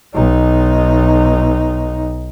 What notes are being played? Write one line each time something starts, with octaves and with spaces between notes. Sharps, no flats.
B1 D#4